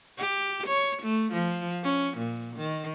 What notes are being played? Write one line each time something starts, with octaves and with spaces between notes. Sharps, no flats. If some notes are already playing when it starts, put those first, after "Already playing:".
G4
C#5
A3
F3
C#4
A#2
D#3